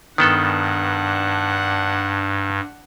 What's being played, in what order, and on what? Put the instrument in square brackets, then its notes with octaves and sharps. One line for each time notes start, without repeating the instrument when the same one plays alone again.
[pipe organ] G2 [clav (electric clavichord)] D#3 B3 A4 [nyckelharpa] D4 F#5